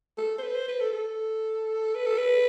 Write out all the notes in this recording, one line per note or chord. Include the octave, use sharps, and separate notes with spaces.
A4
C5
B4
C5
B4
A4
A4
B4
A4
B4